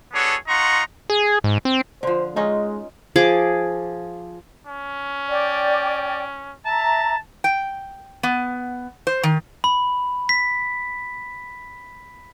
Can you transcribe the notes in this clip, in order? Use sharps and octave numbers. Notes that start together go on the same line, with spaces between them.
B3 D4 F#4 G#4 A4 C#5
D#4 F4 F#5 A#5 C6 C#6
G#4
G#2
C4
D3 F3 C5
G#3 C#4 D#4 F4
F3 G#4 D6
C#4
D5 G5
E5 A5 A#5
G5
B3
C5
D#3
B5
B6